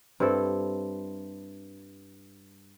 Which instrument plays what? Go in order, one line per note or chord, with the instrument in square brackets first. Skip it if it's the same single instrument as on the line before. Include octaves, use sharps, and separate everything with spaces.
[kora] G2 C4 E4 A4